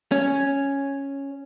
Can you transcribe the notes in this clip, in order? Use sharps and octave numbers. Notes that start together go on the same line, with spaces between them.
C#4